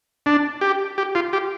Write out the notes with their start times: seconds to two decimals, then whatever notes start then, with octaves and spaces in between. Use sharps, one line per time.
0.26 D4
0.61 G4
0.98 G4
1.15 F4
1.33 G4